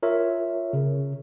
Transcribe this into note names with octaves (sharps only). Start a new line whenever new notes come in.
F4 A#4 C#5 E5
C#3